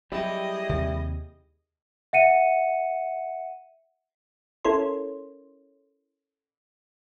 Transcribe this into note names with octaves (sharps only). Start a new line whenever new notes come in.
F#3 G3 E4 G4 G#4 D#5 G5
D#2 C3
E5 F#5 C#7 D#7
C#4 E4 A4 A#4 C#5 C6